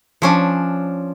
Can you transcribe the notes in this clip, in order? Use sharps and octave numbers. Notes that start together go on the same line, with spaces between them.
F3 C#4 D4